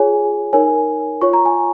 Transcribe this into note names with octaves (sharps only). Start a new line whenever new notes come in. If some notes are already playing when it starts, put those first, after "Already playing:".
Already playing: F4 G#4 C#5 G#5
D#4 A#4 C#5 G#5
F4 C#5 C#6
A#5
G#5